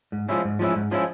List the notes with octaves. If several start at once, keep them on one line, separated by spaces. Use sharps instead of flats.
G#2
F3 G#3 C#4 E4
G#2
F3 G#3 C#4 E4
G#2
F3 G#3 C#4 E4